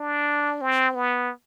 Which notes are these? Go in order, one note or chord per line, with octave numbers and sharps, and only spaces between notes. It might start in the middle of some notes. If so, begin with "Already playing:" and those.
Already playing: D4
C4
B3